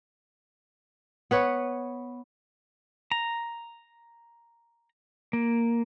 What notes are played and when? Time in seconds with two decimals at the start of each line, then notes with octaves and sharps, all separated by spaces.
1.31 B3 B4 C#5
3.12 A#5
5.33 A#3